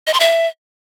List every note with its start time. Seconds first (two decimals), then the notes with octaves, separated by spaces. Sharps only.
0.07 D#5
0.14 C6
0.20 E5